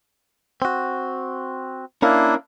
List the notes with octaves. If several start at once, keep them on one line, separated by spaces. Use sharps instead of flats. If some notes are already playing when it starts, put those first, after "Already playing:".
C4 F#4
A#3 C#4 D4 E4 A#4 F5